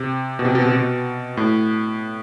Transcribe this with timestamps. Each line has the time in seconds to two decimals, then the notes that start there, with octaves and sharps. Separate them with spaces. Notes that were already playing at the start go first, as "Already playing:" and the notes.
Already playing: C3
0.39 B2
0.45 C3
0.55 B2
0.66 C3
0.76 B2
1.37 A2